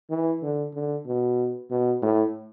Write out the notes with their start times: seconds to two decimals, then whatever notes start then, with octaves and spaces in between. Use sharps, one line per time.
0.10 E3
0.43 D3
0.74 D3
1.07 B2
1.71 B2
2.03 A2